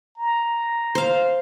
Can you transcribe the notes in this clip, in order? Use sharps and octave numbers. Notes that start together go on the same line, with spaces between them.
A#5
C5 F5